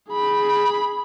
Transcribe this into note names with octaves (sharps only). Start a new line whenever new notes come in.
G#4 B5